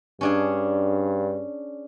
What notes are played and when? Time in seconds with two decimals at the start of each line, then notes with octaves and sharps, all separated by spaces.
0.21 G2 C#4 D4 G#4